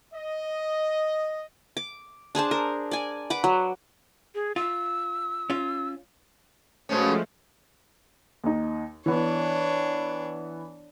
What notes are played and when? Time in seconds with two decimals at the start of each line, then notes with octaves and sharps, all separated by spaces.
0.14 D#5
1.77 D6
2.35 D4 G#4 C5 A5
2.51 A#4
2.91 D5 G#5
3.30 B4 F#5 D6
3.44 F#3
4.35 G#4
4.56 F4 E6
5.50 C#4 F4
6.89 B2 F3 G#3 A3 C#4
8.44 D#2 D#4
9.06 E3 B3 D4 C#5